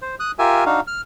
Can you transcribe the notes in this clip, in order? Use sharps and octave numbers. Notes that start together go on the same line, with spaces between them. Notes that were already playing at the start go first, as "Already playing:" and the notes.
C5
D#6 F#6
F4 G4 A#4 E5 G#5
D4 D#4 F#4 F5
F6